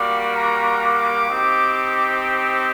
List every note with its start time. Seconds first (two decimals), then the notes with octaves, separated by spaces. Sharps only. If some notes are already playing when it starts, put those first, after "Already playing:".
Already playing: G3 A#3 F#4 D5
0.36 A#5
0.82 D6
1.28 C4 D#4 G4